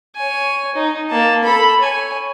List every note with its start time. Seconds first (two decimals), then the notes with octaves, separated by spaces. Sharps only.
0.16 C#5 G#5
0.75 D#4
1.10 A#3 A5
1.44 A4 B5
1.79 C#5 G#5